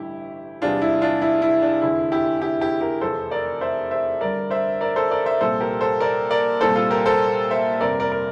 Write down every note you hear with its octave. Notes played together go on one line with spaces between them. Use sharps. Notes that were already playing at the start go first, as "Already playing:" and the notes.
Already playing: A1 G2 D3 E4 G4
E2 C3 G3 D4 F4
E4
D4 F4
E4
E4
D4
F1 E2 D3 E4
E4 G4
E4 G4
E4 G4
G4 A#4
F1 E2 C3 F3 A4 C5
A#4 D5
C5 E5
C5 E5
G1 G2 D3 A#4 D5
C5 E5
A#4 D5
A4 C5
A#4 D5
C5 E5
C2 A#2 F3 A4 C5
G4 A#4
A4 C5
A#4 D5
A#4 D5
C2 A#2 G3 A4 C5
F4 A4
G4 A#4
A4 C5
C5 E5
G1 F2 C3 A#4 D5
A#4 D5
A#4